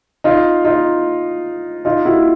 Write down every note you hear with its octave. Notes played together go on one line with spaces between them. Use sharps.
D#4 F4
D#4 F4
D#4 F4
E4 F#4